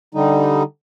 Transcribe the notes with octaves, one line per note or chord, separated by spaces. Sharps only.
D3 G3 D#4